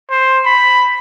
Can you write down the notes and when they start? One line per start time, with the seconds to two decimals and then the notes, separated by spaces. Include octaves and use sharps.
0.10 C5
0.45 B5